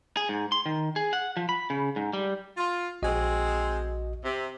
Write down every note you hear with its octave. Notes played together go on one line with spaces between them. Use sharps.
G#4
G#2
C6
D#3
G#4
F#5
F3
B5
C#3
G#2
G3
F4
A#1 G#3 C4 F#4 D#5
C3